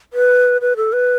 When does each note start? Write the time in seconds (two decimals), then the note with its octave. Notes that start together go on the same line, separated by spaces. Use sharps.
0.13 B4
0.61 B4
0.77 A4
0.93 B4